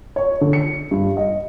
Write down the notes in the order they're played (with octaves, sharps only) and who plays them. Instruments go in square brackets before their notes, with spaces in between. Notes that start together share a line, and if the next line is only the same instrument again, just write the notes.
[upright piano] C#5
D3
C#7
G2
D#5